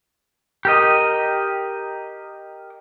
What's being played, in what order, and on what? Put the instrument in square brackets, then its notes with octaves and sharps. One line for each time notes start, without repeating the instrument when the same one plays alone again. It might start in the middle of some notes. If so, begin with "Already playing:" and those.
[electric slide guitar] G4 A#4 D#5